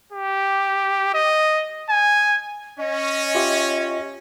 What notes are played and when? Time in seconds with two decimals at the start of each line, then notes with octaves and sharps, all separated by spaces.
0.12 G4
1.14 D#5
1.90 G#5
2.79 C#4 D#5
3.35 F4 G4 E5